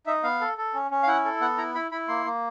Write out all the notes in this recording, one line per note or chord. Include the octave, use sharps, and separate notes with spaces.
D#4 E5
B3 F5
A4
A4
C#4
C#4
F5
E4 F#5
A4
B3 F#5
E4 A#5
E4 B5
E4 B5
A#3 C6
A#3